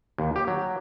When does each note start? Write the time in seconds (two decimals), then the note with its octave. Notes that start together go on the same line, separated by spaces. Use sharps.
0.18 D#2
0.36 G4
0.47 F#3